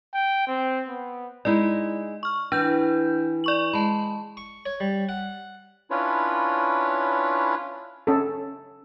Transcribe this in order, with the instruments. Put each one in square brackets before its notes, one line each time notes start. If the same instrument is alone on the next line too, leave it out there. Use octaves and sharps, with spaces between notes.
[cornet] G5
C4
B3
[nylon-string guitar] G#3 D#4 E4 [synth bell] D5
[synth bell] C#6 F6
[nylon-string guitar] E3 [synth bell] D4 G6
[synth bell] D5 C#6 F#7
[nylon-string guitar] G#3 [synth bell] A5 B5
[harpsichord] C#6
C#5
G3
F#5
[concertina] C#4 D4 E4 F4 B4 C#5
[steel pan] C#4 A4